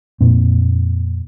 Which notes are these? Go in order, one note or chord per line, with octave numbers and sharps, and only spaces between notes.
F2 A#2 C4